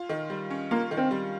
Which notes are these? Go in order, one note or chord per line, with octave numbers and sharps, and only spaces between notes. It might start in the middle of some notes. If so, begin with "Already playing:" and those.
Already playing: F4
D#3
G3
C#4
A#3 F4
D#3
C4
G3